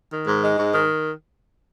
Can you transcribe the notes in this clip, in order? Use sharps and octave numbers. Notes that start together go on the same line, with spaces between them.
D#3
G#2
G#3
G#2
D#3